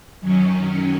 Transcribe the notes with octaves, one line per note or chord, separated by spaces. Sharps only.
F#2 D#3 F#3 C#4